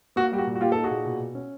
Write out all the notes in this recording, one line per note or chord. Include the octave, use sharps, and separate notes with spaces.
A#3 F#4
G3 G4
F#4
A#2
F#4
A#3 F4 G4
D#4 A4
F#4 G#4
A#2
B2
B2
C#4